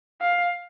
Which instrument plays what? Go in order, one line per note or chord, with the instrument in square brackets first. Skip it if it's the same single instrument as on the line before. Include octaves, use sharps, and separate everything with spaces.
[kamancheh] F5